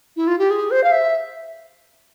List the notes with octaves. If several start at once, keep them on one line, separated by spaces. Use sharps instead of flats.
E4
F4
G4
G#4
C5
F5
E5